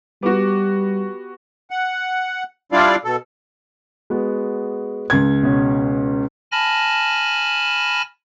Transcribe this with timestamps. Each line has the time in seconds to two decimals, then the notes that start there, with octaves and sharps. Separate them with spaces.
0.23 G3 B3 F#4 G4 D6
1.71 F#5
2.72 G3 D4 E4 F4 D5 F5
3.05 B2 A4
4.10 G#3 B3 F#4
5.10 C#2 G#6
5.43 B2 C#4
6.52 G#5 A5 B5 F6 A#6